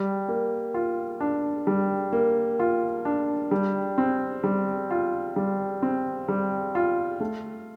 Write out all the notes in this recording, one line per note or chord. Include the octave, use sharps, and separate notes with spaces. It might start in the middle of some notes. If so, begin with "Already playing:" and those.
Already playing: G3
A#3
F4
D4
G3
A#3
F4
D4
G3
C4
G3
F4
G3
C4
G3
F4
A3